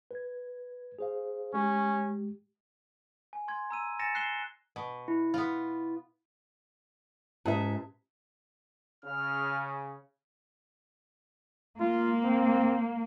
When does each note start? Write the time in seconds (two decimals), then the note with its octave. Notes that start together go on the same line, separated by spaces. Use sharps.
0.11 B4 G#6
0.99 G#4 C5 F5
1.54 G#3 C#4 G4
3.33 G#5
3.48 C6 G#6
3.71 A#5 E6 D#7
3.99 G#5 A6 A#6 C#7 E7
4.15 F#6 C7 E7 G7
4.76 B2
5.08 E4
5.34 B3 F4
7.45 G#2 C#4 G4 E5
9.05 C#3 F6
11.80 A#3 F4
12.24 C4